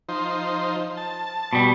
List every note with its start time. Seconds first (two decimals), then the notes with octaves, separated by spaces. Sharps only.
0.09 F3 D#4 C5
0.97 A5
1.53 B2 G3